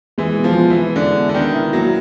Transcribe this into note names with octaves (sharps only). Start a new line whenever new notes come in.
E3 G#3
B2
F3
B3
E3
E4
D3 G#3
B2
D3
D#3 B3
E4
F#3 A#3